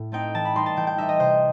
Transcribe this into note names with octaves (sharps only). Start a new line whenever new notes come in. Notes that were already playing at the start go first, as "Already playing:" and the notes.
Already playing: A2
A3 C4 D#4 G5
E3 A5
B5
G3 D#4 C6
A5
E3 G5
G5
G3 D#4 E5
D#5
C3 C5